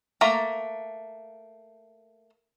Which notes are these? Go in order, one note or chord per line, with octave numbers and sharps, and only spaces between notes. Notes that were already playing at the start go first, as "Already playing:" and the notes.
A3 A#3 A#5